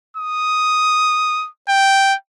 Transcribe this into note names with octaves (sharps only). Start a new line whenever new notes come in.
D#6
G5